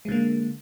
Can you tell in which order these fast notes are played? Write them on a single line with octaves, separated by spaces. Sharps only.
G#3 D3 A#3